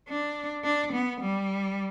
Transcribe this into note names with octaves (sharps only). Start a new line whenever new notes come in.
D4
D4
B3
G3